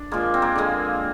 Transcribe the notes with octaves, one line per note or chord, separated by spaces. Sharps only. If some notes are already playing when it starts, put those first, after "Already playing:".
Already playing: D4
A#2 F3 G#3 A#3
C4
A#3
D3 G#3 A#3